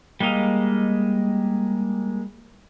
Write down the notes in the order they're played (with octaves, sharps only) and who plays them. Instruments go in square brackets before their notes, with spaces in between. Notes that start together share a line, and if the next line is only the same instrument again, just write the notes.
[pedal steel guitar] G3 G#3 A#3 D#5 F5